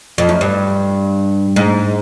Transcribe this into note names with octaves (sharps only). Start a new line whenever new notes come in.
F2
F#2
G2
G#2